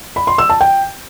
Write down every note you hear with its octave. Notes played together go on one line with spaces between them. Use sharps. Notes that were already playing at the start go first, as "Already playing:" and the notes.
B5
C6
E6
A5
G5